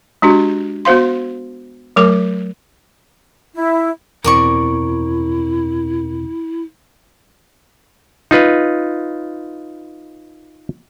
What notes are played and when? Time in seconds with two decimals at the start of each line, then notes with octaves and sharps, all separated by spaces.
0.22 G#3 D4 F#4 G4
0.85 B3 F#4 C5 F5 C6
1.96 F#3 A3 A#4 D6
3.55 E4
4.24 E2 B2 C4 E4 A#4 D5 C#6
8.31 D#4 F4 B4